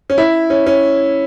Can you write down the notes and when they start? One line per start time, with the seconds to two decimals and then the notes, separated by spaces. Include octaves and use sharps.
0.10 C#4
0.18 E4
0.50 C#4
0.66 C#4